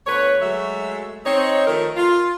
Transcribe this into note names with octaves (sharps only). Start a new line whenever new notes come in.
D2 B3 B4 C#5
F#3 G#3 A3 F#4 E5
C4 D#4 C#5
D#3 F3 A3 D#4 A4 A#4
F4